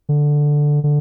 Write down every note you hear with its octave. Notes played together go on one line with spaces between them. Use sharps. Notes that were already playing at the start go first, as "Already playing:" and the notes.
D3
D3